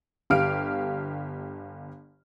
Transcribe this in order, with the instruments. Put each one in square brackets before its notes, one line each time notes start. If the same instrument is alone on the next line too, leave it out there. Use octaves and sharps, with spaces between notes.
[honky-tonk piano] G1 G4 F5 F6 D7